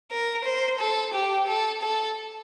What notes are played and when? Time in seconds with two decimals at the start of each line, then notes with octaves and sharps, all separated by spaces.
0.11 A#4
0.45 C5
0.80 A4
1.14 G4
1.48 A4
1.82 A4